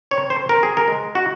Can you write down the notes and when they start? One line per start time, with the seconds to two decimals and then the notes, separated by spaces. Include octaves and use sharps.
0.11 C4 C#5
0.30 C5
0.49 C4 A#4
0.63 G#4
0.77 A#4
0.88 G#3
1.15 F#4